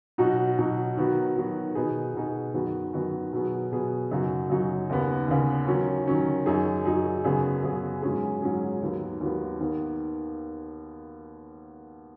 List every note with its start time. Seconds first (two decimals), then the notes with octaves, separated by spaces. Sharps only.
0.18 B2 F#3 D#4 F#4
0.58 B2 F#3 D#4 F#4
0.97 D#3 F#3 B3 F#4
1.36 D#3 F#3 B3 F#4
1.75 B2 B3 D#4 G#4
2.14 B2 B3 D#4 G#4
2.54 F#2 D#3 B3 F#4
2.94 F#2 D#3 B3 F#4
3.33 B2 F#3 B3 G#4
3.72 B2 F#3 B3 G#4
4.11 F#2 C#3 F#3 D#4 F#4
4.49 F#2 C#3 F#3 D#4 F#4
4.90 D#2 C#3 B3
5.28 D#2 C#3 B3
5.67 D#3 F#3 C#4
6.07 D#3 F#3 C#4
6.46 F#2 F#3 D#4 G#4
6.85 F#2 F#3 D#4 G#4
7.25 F#2 C#3 B3 G#4
7.64 F#2 C#3 B3 G#4
8.02 G#2 F#3 C#4 G#4
8.42 G#2 F#3 C#4 G#4
8.82 D#2 D#3 F#3 B3
9.21 D#2 D#3 F#3 B3
9.60 D#2 D#3 B3